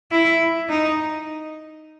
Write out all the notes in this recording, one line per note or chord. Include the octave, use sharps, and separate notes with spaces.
E4
D#4